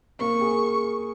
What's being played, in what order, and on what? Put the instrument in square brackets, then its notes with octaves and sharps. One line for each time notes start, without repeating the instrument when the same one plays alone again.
[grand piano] A#3 [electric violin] C#6
[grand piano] G#4